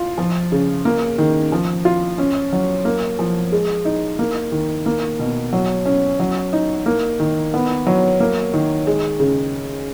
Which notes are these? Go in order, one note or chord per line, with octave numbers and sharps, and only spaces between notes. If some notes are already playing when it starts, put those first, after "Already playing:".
Already playing: F4
F3
C#3
A#3
D#3
F3
F4
C#4
F#3
A#3
F3
G#3
D#4
A#3
D#3
A#3
B2
F#3
C#4
F#3
D#4
A#3
D#3
B3
F#3
A#3
D#3
G#3
C#3